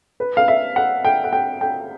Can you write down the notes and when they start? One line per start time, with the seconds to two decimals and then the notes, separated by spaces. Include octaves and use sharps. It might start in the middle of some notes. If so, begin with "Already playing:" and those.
0.20 B4
0.37 F5
0.48 E5
0.76 F#5
1.05 G5
1.24 F#5
1.33 G5
1.61 G5